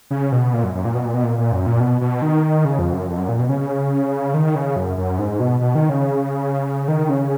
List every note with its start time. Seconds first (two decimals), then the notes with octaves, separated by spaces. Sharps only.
0.11 C#3
0.32 B2
0.53 A#2
0.64 F#2
0.75 F#2
0.85 A#2
0.95 B2
1.05 A#2
1.14 B2
1.24 A#2
1.38 A#2
1.52 F#2
1.66 A#2
1.80 B2
2.01 B2
2.22 D#3
2.65 C#3
2.79 F2
2.93 F#2
3.07 F2
3.18 F#2
3.29 A#2
3.39 B2
3.49 C#3
4.34 D#3
4.55 C#3
4.76 F#2
4.98 F#2
5.19 G#2
5.40 B2
5.61 B2
5.75 D#3
5.89 C#3
6.88 D#3
7.09 C#3